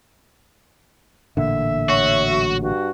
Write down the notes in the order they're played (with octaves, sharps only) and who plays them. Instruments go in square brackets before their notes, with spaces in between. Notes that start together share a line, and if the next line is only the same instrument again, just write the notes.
[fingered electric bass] A1 A#2 D3 [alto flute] E5
[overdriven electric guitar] F#4 [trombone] C#5
[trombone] F#3
[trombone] G2 [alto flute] F#4